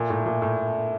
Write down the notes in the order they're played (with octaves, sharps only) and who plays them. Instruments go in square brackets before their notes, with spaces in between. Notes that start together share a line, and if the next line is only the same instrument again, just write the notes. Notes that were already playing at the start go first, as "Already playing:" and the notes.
Already playing: [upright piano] A#2 [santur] A3
[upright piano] A2
[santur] D4
[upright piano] A#2
[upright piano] A2 [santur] A3
[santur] D4